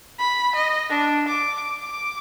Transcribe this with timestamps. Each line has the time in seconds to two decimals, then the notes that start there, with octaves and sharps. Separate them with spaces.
0.19 B5
0.55 D#5
0.90 D4
1.28 D6
1.80 D6